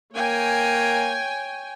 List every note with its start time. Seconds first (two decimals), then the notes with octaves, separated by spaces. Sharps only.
0.13 A#3 C#5 G5 G#5